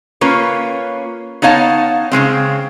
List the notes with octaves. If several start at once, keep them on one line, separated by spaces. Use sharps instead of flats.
A#3 C#4 F4 B4 C#5
B3 D#4 C#5 F5 A5
C#3 F#3 G#3 C4